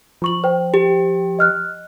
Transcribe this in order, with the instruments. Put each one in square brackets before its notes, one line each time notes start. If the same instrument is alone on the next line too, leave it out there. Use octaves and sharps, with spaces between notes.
[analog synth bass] F3 [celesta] F4 C#6 F#7
[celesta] C5 G5
[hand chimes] G4
[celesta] D#5 F6 F#6